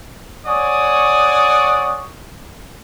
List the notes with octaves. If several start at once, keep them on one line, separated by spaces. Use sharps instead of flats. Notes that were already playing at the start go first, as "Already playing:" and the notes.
C#5 D5 F#5 G#5 C#6 D#6